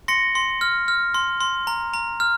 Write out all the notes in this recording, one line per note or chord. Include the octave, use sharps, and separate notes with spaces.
C6 A#6 C#7
C6
F6
F6
C6
C6
A#5
A#5
F6